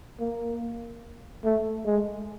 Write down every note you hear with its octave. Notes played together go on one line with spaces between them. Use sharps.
A#3
A3
G#3